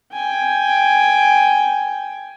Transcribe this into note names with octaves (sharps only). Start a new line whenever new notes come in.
G5 G#5